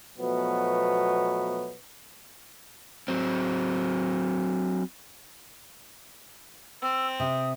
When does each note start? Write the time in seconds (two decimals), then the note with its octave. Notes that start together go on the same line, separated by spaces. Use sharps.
0.18 B2 F3 F#3 A3 B3
3.08 F#3 C4
6.82 C4 E6
7.20 C3 D#6